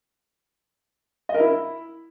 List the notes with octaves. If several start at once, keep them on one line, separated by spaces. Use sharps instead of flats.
D#5
A#4
E4